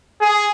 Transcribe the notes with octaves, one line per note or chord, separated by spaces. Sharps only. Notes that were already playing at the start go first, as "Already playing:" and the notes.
G#4